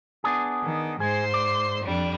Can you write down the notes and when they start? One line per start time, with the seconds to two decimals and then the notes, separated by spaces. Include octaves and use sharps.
0.24 B3 D4 G#4
0.63 D#3
1.00 G#2 G#3 G#4 C5 C6
1.34 D5
1.84 F2 G3 D4